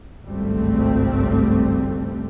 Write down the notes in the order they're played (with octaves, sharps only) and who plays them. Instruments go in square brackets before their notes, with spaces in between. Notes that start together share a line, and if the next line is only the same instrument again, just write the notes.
[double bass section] G#1 C#2 G2 G3 A3 C4